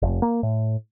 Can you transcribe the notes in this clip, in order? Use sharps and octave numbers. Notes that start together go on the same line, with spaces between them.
F1
A#3
A2